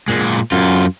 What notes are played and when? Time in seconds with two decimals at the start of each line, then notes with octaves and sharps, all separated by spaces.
0.08 A#2 G#3
0.52 F#2 F4